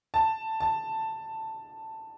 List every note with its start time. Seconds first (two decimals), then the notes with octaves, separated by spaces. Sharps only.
0.14 A5
0.60 A5